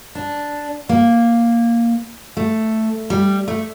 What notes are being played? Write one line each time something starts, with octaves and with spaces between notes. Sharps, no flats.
D4
A#3
A3
G3
A3